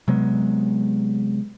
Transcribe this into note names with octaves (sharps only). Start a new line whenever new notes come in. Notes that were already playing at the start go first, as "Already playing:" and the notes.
C3 F#3 G#3 B3